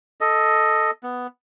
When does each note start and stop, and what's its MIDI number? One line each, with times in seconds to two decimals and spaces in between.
0.21 0.91 69
0.21 0.91 75
1.03 1.27 59